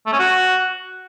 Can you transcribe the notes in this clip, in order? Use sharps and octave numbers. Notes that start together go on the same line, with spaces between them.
A3
C#4
F#4